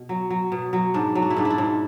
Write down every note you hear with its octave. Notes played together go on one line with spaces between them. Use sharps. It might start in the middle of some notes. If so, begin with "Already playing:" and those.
Already playing: B2
F#3
F#3
B2
F#3
G#2 D4
F#3
D4
E4
G#2 D4
E4
D4
G#2